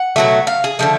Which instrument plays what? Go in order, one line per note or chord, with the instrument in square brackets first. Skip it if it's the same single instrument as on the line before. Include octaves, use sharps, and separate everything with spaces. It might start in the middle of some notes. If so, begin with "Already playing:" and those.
Already playing: [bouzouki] F#5
B2 F#3 A3
F5
G#4
D3 F3 G#3 A3